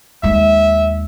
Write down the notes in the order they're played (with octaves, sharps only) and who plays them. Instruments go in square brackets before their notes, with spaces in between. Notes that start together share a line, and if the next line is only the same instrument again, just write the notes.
[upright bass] D#2 G#3 [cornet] E5